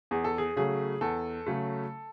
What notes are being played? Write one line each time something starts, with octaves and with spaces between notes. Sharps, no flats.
E2 G#4
A4
G#4
C#3 F#3 A3 G#4
E2 A4
C#3 F#3 A3